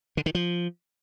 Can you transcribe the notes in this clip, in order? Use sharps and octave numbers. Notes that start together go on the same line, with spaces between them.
D3
D#3
F3